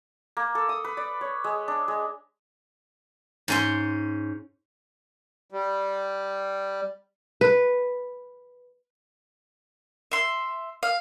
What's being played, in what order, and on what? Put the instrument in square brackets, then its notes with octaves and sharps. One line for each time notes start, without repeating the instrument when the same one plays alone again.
[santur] A#3
A4
D#6
B4
D5
C#5
G#3
D4
G#3
[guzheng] G#2 C#4 C6
[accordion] G3
[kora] B4
[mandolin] E5 C6
F5